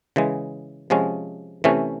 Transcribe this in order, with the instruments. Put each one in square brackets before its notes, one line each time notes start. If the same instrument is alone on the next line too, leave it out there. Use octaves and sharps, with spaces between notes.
[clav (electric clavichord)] C#3 E3 G#3
C3 F3 G#3 C#4
C3 E3 A3 C#4